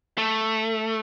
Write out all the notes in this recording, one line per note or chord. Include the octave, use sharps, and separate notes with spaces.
A3